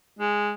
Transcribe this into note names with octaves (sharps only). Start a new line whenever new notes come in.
G#3